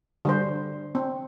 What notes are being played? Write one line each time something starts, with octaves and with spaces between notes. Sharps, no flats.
D3 G3 C5
C4